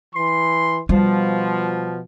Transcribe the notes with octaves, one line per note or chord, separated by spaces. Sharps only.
E3 C6
B2 F3 G3